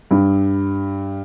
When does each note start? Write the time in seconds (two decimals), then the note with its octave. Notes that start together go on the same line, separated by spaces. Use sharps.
0.11 G2